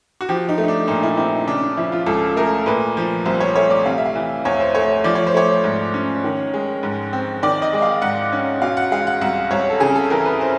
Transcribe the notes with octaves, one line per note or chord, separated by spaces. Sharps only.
F#4
F3 G4
D#4
A3
D#4
D4
A#2 D#4
E4
C4 E4
D#4
C#3 D4
D4
F3 E4
F4
C#2 A4
A3 A#4
A#2 B4
F3
C2 C5
C#5
A3 C#5
D5
C3 F5
E5
F5
E3
E2 C#5
C5
A3 C#5
F3 D5
C#5
C5
A3 C#5
G#2
C#4
D#3
G#3
G#2
C4
D#3 D5
D#5
G#3
F5
G#2 F#5
C#4
B2 F5
F#5
G#3 F5
F#5
C2 F#5
C2 C#5
A4
C#3 G#4
A4
E3 A#4
B4
C5